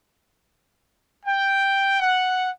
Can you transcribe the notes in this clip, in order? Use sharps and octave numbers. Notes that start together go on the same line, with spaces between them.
G5
F#5